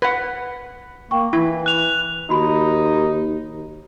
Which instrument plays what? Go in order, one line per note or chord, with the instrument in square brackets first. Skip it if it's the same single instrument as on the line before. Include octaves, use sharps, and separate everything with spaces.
[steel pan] B4 F#5
[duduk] A#3 [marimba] G5 C#6
[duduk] E3 [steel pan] E4
[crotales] F#6 F7
[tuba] D#2 [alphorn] D#4 [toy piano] F#4 B5